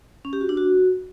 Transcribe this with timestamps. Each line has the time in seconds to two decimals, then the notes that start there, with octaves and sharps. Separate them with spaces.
0.25 C#4
0.33 G4
0.41 F#4
0.49 D4
0.57 F#4